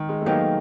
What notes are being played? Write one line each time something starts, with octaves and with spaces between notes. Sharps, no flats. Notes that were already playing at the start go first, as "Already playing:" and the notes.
Already playing: D#3
G#3
A3
F#3 A#3 B3 D#4 G4